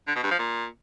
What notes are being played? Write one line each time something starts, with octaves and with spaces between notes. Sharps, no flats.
D3
B2
G2
F3
A#2